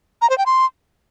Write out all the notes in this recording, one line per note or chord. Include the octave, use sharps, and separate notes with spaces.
A#5
C5
G5
C6